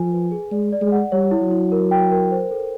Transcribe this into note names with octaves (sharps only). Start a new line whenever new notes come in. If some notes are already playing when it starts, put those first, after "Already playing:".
Already playing: F3 A4 G#5
B4
G#4
G#3 D5
D5
G#3
F#5
G3 C#5
E4
F#3
E4
A#4
G5
A#4
C5
A4